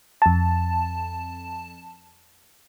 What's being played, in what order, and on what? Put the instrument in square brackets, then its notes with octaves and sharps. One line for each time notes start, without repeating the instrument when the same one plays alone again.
[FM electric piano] F2 A5